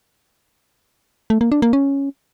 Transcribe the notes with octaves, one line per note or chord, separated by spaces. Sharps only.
A3
A#3
D4
A#3
C#4